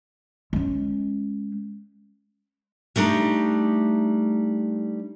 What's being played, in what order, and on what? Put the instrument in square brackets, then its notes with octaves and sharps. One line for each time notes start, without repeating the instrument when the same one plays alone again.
[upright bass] G#3 C#4
[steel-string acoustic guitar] G3 A3 D4 D#4